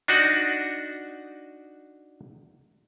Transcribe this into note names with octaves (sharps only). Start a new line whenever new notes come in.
D4 D#4 F#4 F#5